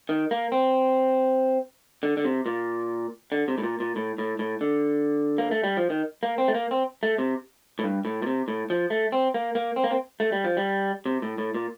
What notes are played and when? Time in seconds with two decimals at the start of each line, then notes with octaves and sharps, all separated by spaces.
0.09 D#3
0.31 A#3
0.52 C4
2.03 D3
2.17 D3
2.25 C3
2.46 A#2
3.32 D3
3.48 C3
3.58 A2
3.63 A#2
3.80 A#2
3.96 A2
4.18 A2
4.39 A2
4.61 D3
5.38 A#3
5.51 A3
5.64 G3
5.77 F3
5.90 D#3
6.23 A#3
6.38 C4
6.48 A3
6.54 A#3
6.71 C4
7.03 A3
7.18 C3
7.79 A2
7.84 G2
8.05 A2
8.22 A#2
8.26 C3
8.48 A2
8.70 F3
8.90 A3
9.12 C4
9.34 A#3
9.55 A#3
9.76 C4
9.84 A#3
9.91 C4
10.20 A3
10.32 G3
10.44 F3
10.57 G3
11.06 C3
11.22 A2
11.38 A2
11.54 A#2